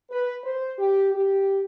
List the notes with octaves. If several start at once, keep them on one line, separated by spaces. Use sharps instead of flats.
B4
C5
G4
G4